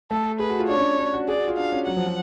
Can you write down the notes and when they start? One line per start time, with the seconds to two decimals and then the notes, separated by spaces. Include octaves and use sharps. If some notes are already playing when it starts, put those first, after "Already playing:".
0.11 A3 A4
0.40 G#4 B4
0.50 F#4
0.59 F4
0.69 D4 C#5
0.75 C#4
0.80 D4
0.99 D4
1.14 F#4
1.28 G#4 D5
1.38 F#4
1.48 F4
1.57 D4 F5
1.72 C#4
1.86 F#3 F#5
1.97 F3
2.07 F#3